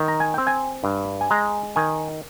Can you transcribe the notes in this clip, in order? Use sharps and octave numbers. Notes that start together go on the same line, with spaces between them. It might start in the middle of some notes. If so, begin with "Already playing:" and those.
Already playing: D#3
A#5
G#5
C4 G5
G#5
G2
G#5
G#3 A#5
D#3 G#5